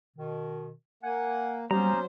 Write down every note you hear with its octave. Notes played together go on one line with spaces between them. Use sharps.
B2 D#3
A#3 F#5 G#5
F#3 G3 A#3 B3 C#4 C5 A#5